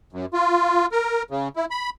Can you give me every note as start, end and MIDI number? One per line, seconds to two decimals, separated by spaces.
0.13 0.26 42
0.33 0.86 65
0.92 1.23 70
1.31 1.48 49
1.56 1.65 64
1.71 1.90 83